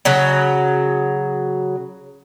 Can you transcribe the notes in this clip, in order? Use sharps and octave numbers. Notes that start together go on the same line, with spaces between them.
C#3 F#3